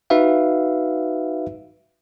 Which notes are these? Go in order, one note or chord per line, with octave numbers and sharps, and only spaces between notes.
D#4 F#4 B4 E5 F5